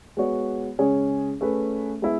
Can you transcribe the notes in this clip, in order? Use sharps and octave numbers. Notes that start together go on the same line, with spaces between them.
G#3 B3 F#4 C#5
C#3 G#3 C#4 G#4 C#5
A3 C#4 G#4 B4
G#3 B3 E4 B4